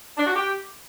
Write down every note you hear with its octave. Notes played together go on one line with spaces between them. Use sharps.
D4
F#4
G4